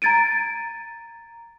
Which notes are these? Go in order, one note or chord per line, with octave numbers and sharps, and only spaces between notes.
A#5 G#6 A6 D7 D#7